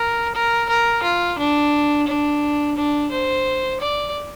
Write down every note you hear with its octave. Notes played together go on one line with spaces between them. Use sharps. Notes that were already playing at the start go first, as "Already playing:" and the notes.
Already playing: A#4
A#4
A#4
F4
D4
D4
D4
C5
D5